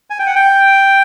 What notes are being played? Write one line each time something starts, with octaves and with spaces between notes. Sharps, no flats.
G#5
G5
F#5
G5